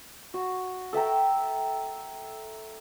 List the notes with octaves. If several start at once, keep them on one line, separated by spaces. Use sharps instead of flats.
F#4
A4 E5 G5 A#5